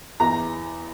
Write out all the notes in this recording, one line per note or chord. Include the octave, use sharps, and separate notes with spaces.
E2 E3 A#5